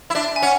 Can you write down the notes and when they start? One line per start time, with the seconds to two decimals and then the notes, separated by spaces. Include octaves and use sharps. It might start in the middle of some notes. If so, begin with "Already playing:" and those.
0.10 E4
0.15 D4 E5
0.36 G#5
0.42 C#4 F#5